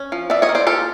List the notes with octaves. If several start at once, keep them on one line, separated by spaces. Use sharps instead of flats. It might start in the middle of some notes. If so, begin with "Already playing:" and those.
Already playing: C#4
F3
F3 D5 E5
C#5 D#5
A#3
C5 D5
F4 G4 A4